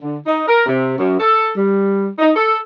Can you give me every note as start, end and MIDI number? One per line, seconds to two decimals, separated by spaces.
0.01 0.17 50
0.26 0.42 63
0.47 0.63 70
0.66 0.93 48
0.98 1.15 42
1.19 1.49 69
1.55 2.08 55
2.19 2.30 63
2.36 2.58 69